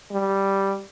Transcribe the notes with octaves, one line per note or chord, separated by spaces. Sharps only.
G3